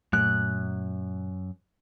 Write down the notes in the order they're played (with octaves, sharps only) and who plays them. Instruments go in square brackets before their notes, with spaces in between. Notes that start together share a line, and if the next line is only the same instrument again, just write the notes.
[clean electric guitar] F#2 [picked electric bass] A#2 A3 [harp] F#6